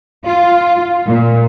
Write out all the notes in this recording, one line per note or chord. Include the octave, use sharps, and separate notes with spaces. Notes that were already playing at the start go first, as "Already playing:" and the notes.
F4
A#2